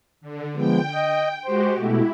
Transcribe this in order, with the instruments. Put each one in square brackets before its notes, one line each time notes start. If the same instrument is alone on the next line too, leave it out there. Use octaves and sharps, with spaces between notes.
[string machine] D3
[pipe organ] F3 G#3 B3 [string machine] G5
[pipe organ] D#5
[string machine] G#3 F#4 G4 [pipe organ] C5
[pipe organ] B2 A3 [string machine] E4